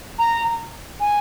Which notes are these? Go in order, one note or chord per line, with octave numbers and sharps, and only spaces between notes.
A#5
G#5